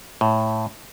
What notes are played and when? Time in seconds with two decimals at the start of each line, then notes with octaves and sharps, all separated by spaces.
0.21 A2